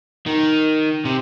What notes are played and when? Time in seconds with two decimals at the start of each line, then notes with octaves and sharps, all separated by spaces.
0.27 D#3
1.05 C3